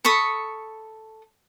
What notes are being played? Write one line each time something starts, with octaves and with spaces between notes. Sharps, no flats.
A4 B5 C#6 D#6